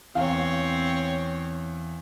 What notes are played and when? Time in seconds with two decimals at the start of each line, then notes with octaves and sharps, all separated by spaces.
0.15 E2 C4 C#5 F5